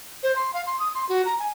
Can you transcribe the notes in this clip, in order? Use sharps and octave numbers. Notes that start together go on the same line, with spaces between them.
C5
C6
F5
C6
D#6
C6
F#4
A#5
G#5